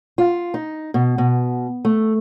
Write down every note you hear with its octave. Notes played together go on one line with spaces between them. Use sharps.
F4
D#4
B2
B2
A3